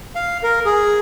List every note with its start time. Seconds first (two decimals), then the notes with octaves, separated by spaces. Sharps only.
0.15 F5
0.43 A#4
0.65 G#4